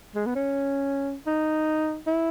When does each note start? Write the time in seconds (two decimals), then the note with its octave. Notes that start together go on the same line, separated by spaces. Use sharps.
0.15 G#3
0.26 B3
0.35 C#4
1.27 D#4
2.07 E4